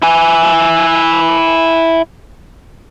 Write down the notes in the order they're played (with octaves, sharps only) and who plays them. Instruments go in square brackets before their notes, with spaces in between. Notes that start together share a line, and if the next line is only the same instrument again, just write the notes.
[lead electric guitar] E4 G#5